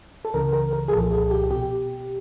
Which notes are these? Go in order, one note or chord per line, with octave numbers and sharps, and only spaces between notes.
A4
C#2 C#3 E3 A#4
A#4
A#4
G#4
C2 A#2 F3 A4
G#4
G4
B2 G4